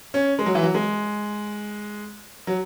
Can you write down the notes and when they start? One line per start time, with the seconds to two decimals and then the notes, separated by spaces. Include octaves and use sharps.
0.14 C#4
0.39 G#3
0.46 F#3
0.55 E3
0.63 F#3
0.74 G#3
2.47 F#3